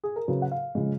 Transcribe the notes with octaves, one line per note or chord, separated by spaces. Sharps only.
G#4
A#4
C#3 F#3 B4
F#5
F5
C#3 F3 G#3